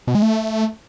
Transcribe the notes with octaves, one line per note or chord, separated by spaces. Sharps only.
B2
G#3
A3